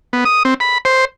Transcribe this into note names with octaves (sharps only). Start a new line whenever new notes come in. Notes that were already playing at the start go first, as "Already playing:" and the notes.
B3
D#6
C4
B5
C5